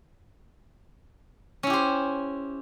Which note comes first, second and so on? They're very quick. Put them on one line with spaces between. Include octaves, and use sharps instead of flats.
C#4 E4 G4 C5